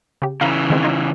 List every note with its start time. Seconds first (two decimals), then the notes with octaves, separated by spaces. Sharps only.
0.22 C#3 G4
0.41 C#3 E3 F5 A#5 B5
0.70 D#3 G#3 C4
0.83 D#4 F4 C#5